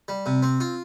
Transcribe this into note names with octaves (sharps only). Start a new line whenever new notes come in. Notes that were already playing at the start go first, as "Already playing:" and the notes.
G3
C3
C4
F4